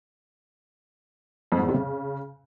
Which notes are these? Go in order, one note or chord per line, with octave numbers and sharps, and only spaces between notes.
F2
G#2
E2
C3
C#3